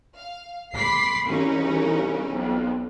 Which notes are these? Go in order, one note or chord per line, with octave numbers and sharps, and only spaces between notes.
F5
B5 C6 D6 B6 C7
C2 C#3 E3 C#4 D#4
B1 F2